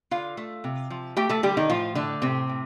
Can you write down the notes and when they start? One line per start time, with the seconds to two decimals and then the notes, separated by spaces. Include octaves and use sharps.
0.11 D3 F4 F5
0.37 A3
0.64 C3
0.90 F3
1.17 A3 G4 G5
1.29 A3 A4
1.43 D3 G3 G4
1.57 D#3 D#4
1.70 A2 F3 F4
1.95 D3 A3 D4
2.22 A2 C3 C4
2.49 A2